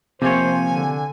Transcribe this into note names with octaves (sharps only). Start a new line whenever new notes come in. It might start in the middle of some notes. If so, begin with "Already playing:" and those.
C3 F3 A#3 C5 C#5 G#5
D3